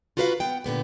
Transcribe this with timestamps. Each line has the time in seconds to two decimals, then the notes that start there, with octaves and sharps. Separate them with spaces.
0.17 F4 F#4 A#4 B4 D#5 F5
0.40 B3 F#5 G5
0.64 A#2 D3 B3 G4